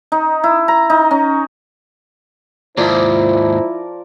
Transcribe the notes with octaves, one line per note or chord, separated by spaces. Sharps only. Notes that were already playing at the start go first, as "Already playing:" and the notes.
D#4
E4
A#5
D#4
C#4
D#2 G#2 F3 E4 A#4 C5 D5